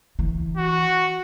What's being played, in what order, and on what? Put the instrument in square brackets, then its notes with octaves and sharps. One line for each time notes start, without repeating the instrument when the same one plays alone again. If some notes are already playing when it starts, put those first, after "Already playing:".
[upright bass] E3
[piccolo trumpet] F#4